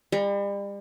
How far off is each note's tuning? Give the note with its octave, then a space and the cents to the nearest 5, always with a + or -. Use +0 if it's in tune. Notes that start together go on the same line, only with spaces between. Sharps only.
G3 +40 B5 -45